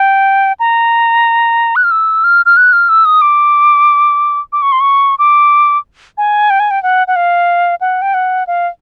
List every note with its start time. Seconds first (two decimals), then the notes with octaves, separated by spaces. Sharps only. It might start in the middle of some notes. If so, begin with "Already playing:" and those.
Already playing: G5
0.60 A#5
1.76 F#6
1.84 F6
1.91 E6
2.24 F6
2.46 F6
2.57 F#6
2.73 F6
2.89 E6
3.05 D#6
3.22 D6
4.53 D6
4.62 C#6
4.72 C6
4.80 C#6
5.19 D6
6.18 G#5
6.50 G5
6.60 G#5
6.71 G5
6.83 F#5
7.08 F#5
7.16 F5
7.81 F#5
8.02 G5
8.14 F#5
8.47 F5